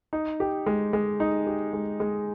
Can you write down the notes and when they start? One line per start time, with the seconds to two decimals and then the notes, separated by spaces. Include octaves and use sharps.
0.13 D#4
0.40 G4
0.66 G#3
0.93 G#3
1.20 D#4
1.47 G4
1.73 G#3
2.00 G#3